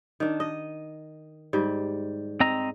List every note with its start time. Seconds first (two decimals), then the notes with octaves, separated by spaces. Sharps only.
0.20 D#3 D4
0.40 D#5
1.53 G#2 G3
2.40 C4 D#5 A#5